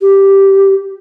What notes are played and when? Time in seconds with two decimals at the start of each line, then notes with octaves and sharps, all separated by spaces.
0.01 G4